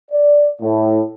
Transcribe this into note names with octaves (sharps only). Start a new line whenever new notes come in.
D5
A2